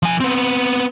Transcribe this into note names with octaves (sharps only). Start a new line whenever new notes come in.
F3 G#5
B3 C4